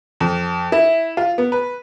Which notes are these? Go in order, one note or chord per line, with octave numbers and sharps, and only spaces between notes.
F2
E4
F4
B3
B4